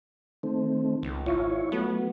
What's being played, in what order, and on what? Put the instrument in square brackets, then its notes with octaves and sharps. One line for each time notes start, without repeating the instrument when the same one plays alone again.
[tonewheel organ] D#3 A3 C4
[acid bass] C#2
[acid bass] G#1 [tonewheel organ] E4 F4 C#5
[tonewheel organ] F#3 A3 [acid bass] B3